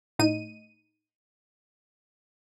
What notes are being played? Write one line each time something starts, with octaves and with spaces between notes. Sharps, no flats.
A2 D#4 D#7